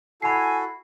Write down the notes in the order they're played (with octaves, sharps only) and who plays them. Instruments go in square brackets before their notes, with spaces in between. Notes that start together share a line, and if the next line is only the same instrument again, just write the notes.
[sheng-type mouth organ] E4 F#4 A4 [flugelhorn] G#5 [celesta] B5 C7